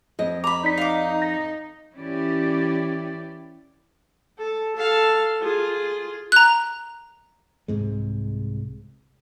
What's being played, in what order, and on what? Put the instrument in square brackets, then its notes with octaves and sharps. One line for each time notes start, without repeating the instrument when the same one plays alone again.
[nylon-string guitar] F2 D#5
[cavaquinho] A#5 B5 [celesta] D6
[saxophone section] D#4 [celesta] D5 B6
[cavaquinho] F5 D6
[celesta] A#6
[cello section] E3 C#4 E4 G4 D5
[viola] A4
A4 F5
F4 G#4
[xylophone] A#5 F#6
[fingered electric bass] C2 G#2 C3 G#3